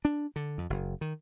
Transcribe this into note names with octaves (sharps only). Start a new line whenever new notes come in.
D4
D3
F2
F#1
D#3